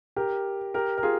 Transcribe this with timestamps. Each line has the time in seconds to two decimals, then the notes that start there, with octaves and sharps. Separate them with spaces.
0.16 G4 A#4
0.74 G4 A#4
0.98 A#4
1.03 F4 G#4